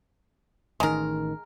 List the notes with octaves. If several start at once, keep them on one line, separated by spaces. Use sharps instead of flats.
A1 D#3 G#3 A#4